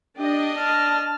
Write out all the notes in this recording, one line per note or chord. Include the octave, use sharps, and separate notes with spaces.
D4 G4 D#5
A5 F6